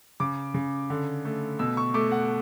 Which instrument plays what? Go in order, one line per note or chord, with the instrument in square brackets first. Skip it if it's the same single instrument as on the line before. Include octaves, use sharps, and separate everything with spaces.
[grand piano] C#3 D6
C#3
D3
A3
B2 E6
C#6
A3 D6
F#5